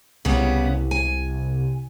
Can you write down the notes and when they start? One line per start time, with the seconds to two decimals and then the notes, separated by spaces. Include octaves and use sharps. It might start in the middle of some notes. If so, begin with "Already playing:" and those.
0.25 C2 C#3 G3 B3
0.91 G#5